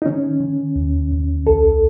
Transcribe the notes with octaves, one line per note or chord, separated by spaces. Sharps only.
D#4
D#3 C#4
D#3
D#2
D#2
C2 A4